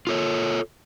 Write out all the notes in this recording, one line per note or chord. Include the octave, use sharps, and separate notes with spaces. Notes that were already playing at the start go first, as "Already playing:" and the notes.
F4 A4 C#5